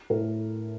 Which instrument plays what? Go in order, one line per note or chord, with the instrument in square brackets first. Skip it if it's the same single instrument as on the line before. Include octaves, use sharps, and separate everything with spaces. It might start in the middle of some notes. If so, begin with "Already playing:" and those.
[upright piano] A2 A#4